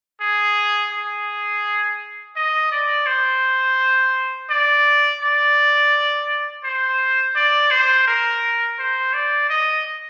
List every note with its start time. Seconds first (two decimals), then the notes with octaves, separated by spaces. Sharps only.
0.21 G#4
0.92 G#4
2.36 D#5
2.72 D5
3.06 C5
4.49 D5
5.22 D5
6.64 C5
7.36 D5
7.71 C5
8.07 A#4
8.79 C5
9.13 D5
9.49 D#5